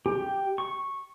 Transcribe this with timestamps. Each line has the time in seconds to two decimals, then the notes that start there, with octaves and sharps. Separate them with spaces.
0.06 G4
0.58 C#6